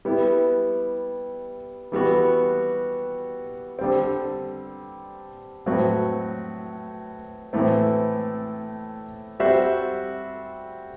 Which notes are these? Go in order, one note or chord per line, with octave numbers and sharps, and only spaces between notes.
G3 B3 E4
E3 G3 B3 F#4
D3 G3 C4
A2 F#3 C4 F#4 B4
A2 E3 A3 C4
G3 C4 F#4 C5 E5